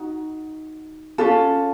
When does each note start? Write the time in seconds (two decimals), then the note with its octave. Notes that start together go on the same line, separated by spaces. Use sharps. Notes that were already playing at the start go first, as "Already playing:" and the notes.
Already playing: D#4 F#4
1.18 C#4 F4 A4